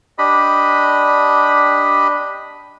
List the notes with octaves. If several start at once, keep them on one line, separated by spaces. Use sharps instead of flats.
D4 G4 D#5 B5